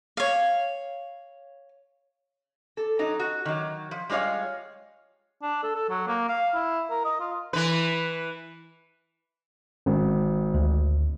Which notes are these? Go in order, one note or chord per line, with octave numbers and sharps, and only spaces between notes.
C#5 F5
A4
F#3 D#4
F#4
D#3 F#3
F3
G3 G#3 F4 C#5 F5
D4
A4
A4
F#3
A#3
F5
E4
A#4
D#5
F4
E3 B4
G#1
D2